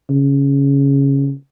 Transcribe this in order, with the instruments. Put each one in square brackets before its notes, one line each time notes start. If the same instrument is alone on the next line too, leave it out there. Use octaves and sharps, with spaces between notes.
[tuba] C#3